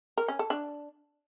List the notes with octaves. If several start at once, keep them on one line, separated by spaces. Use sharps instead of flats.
A#4
C#4
A4
D4